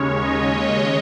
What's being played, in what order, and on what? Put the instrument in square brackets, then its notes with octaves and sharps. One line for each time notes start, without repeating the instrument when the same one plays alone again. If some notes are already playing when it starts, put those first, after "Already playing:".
Already playing: [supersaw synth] D#2 C#3 G#3 C#4 C#5
D#5